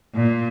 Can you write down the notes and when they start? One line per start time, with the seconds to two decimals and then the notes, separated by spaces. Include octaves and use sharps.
0.15 A#2